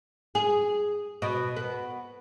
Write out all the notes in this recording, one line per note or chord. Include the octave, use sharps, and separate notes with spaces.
G#4
B2
B3